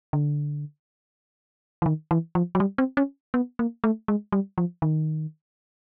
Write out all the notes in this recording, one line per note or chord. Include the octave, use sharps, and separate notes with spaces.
D3
E3
D#3
E3
F3
F#3
G3
C4
C#4
B3
A#3
A3
G#3
G3
F3
D#3